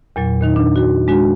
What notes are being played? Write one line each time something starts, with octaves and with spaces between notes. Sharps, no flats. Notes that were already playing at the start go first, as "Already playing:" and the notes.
E2 A#2 F#3
A#2 D#3 D#4
D4
F#4
G#3 D4 F#4